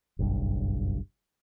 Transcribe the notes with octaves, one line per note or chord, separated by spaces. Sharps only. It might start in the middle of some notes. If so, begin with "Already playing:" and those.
F#1 B1 G2